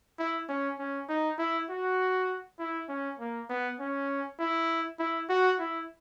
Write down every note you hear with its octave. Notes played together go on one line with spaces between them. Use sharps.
E4
C#4
C#4
D#4
E4
F#4
E4
C#4
A#3
B3
C#4
E4
E4
F#4
E4